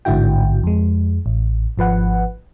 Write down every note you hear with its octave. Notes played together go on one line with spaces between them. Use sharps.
A1 G#2 D3 E4 F#4 G5
F2 G#3
A1
G#1 F3 B4 F#5